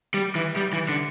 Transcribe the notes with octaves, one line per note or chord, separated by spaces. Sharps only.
G3
E3
G3
E3
D3